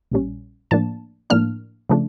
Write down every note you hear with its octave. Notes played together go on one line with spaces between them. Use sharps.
A#1 A#2 G3 C#4
A2 F3 A#3 D4 A5
A2 F3 A#3 D4 F6
C#3 F3 A3 D4